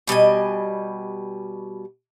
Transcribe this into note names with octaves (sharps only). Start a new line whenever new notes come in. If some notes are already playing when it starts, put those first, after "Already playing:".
B2 G3 D#5 G#5